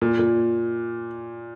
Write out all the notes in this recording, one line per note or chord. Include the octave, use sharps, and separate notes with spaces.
A#2
A#2